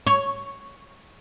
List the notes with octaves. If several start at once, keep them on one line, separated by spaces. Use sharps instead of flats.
C#5